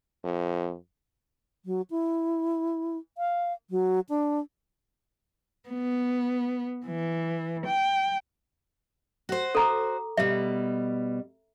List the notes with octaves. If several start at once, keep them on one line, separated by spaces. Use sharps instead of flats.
F2
F#3
E4
F5
F#3
D4
B3
E3
G5
F#4 C5
A4 A#5 D6
B2 G3 E5